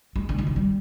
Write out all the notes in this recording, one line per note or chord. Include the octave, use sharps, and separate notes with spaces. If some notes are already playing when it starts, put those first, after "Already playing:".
G#3
D3
D#3
F3
G3